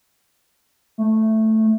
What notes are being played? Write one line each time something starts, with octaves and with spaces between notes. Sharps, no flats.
A3